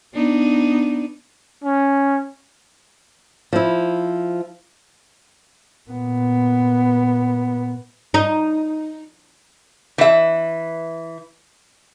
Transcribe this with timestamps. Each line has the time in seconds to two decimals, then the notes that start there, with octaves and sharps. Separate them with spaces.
0.14 B3 D4 D#4
1.63 C#4
3.53 F3 E4
5.90 A#2 B3
8.14 D#4
9.98 E3 E5